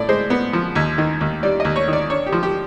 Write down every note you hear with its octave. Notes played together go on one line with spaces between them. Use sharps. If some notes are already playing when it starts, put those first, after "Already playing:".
Already playing: A2 D5
G#3 C5
B3
F3
D#2
D#3
D#2
G3 D5
D#2 D#5
C#5
D#3
D5
D4 C#5
G4
F3
G4